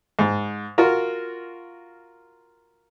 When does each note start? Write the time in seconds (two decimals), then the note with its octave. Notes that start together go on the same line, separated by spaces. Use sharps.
0.19 G#2
0.78 F4 F#4 A#4